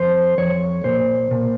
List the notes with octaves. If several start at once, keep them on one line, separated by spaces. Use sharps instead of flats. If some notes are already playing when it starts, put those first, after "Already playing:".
Already playing: F2 C5
F2 C#5
A#2 C5
A#2